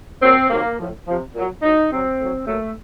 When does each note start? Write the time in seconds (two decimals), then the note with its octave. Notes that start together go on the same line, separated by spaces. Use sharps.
0.22 A#2 F#3 C4
0.50 C3 D#3 F#3 A#3
0.79 A2 F3
1.07 C3 F3
1.35 A#2 F#3
1.62 A2 F#3 D#4
1.91 C3 F#3 C4
2.19 A2 F#3
2.47 A#2 F#3 A3